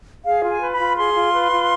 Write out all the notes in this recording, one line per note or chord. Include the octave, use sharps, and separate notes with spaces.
G#4 F5
F4
G#5
B4
B5
F4
G#4 C6
F4
B4
F4